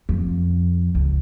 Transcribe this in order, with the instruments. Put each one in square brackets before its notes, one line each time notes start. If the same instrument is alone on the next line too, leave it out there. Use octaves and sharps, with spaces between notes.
[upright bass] F2
C#2